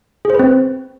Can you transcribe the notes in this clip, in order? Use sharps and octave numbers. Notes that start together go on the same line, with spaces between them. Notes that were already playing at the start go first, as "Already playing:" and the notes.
C4 G#4 B4 C5